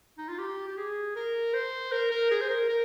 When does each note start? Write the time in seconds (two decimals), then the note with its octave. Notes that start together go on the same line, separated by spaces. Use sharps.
0.18 D#4
0.28 F4
0.39 G4
0.67 G4
0.77 G#4
1.15 A#4
1.54 C5
1.92 A#4
2.11 A#4
2.31 G#4
2.41 C5
2.50 A#4
2.69 A#4